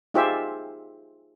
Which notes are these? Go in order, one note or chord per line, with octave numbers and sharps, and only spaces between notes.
D#4 F4 G4 G#4 C5 E5